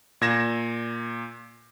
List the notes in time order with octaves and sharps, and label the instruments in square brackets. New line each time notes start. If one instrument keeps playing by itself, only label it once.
[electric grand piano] A#2 G#6 A#6 E7